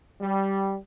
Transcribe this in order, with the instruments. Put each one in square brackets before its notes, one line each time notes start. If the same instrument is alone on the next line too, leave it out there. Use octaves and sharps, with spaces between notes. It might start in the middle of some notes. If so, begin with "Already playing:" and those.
[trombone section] G3